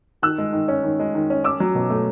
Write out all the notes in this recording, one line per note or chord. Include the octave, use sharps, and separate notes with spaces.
D#3 E6 F#6
G#3
D#3
C#4
D#3
G#3
D#3
C#4
C#4 D6 E6
F#3
B2
A3